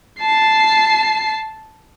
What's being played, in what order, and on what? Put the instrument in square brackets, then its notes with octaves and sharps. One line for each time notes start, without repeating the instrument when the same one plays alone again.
[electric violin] A5 C7